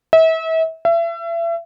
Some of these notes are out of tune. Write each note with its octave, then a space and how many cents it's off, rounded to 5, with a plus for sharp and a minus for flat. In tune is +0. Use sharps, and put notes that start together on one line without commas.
E5 -35
E5 +35